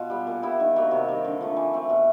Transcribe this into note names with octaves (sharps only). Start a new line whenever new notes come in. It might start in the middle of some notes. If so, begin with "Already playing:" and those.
Already playing: B2 F4
G3 B3
A#2
G3 B3 E4
D#3
F#3 A#3
C3
D#3 G3
D3
F3 A3
E3
A3 C4
B2